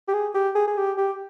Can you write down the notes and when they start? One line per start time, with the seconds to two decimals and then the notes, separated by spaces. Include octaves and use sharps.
0.08 G4
0.13 G#4
0.35 G4
0.55 G#4
0.68 G#4
0.77 G4
0.98 G4